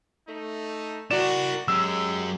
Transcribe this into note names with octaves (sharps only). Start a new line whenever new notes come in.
A3 D#4
E4 F#4 A#4 D5 E7
F#3 G#3 C#4 G4 E6